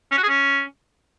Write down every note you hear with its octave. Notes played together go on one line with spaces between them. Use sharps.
C#4
F#4
G#4
C#4